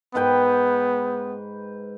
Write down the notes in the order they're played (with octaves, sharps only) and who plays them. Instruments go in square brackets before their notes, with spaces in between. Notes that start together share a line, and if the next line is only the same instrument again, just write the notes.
[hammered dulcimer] G#2 B4 G5 [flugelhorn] B3